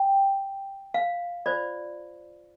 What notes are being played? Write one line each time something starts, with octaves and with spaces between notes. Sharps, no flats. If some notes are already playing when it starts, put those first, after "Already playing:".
Already playing: G5
F5
F4 C5 D5